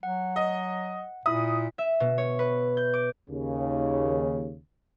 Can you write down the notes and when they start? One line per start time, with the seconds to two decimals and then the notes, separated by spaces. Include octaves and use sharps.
0.03 F#3 F#5
0.36 D#5
1.26 A#2 E4 E5 D#6
1.78 E5
2.00 B2
2.18 C#5
2.39 B4
2.77 G6
2.94 D6
3.30 D#2 C#3